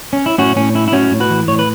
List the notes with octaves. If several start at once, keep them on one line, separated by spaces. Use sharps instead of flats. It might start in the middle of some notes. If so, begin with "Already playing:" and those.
C#4
E4
A2 C#4 F#4
A2 C#4
C#4 E4
E4
A2 C#4 F#4
A2
F#4 B4
E3
A2 C#5
B4